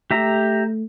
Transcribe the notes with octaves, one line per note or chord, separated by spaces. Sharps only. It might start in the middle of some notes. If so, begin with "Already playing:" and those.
A3 G4 E5 A#5